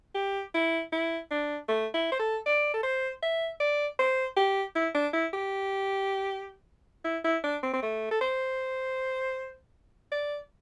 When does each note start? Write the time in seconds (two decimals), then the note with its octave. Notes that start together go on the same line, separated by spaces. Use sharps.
0.15 G4
0.54 E4
0.92 E4
1.31 D4
1.68 A3
1.94 E4
2.12 C5
2.19 A4
2.46 D5
2.74 A4
2.83 C5
3.23 E5
3.60 D5
3.99 C5
4.37 G4
4.75 E4
4.94 D4
5.13 E4
5.34 G4
7.05 E4
7.24 E4
7.44 D4
7.63 C4
7.73 C4
7.83 A3
8.11 A4
8.21 C5
10.12 D5